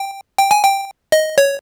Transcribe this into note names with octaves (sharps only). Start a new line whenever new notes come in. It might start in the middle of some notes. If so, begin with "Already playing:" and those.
Already playing: G5
G5
G#5
G5
D#5
C#5